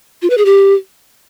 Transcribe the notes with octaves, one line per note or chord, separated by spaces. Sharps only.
F4
B4
G#4
G4